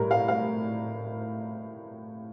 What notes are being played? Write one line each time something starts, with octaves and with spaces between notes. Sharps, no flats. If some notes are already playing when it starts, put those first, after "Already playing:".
Already playing: A2 G3 A#4
F5
F5